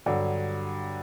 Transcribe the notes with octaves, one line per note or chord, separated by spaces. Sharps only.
G2 D3 F#3